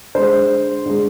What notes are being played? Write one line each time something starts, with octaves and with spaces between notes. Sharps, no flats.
D3 G#3 C5
D3 G#3